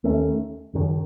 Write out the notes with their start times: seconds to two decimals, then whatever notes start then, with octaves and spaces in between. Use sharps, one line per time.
0.04 D#2 D#3 A3 C#4
0.73 F#1 F#2 D#3